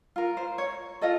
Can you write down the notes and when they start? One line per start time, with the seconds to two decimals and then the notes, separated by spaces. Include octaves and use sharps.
0.16 F4 A#4
0.37 C5
0.58 C#5
1.01 F4 A4 D#5